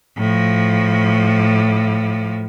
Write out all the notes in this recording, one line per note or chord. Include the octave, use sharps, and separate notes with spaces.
A2 F3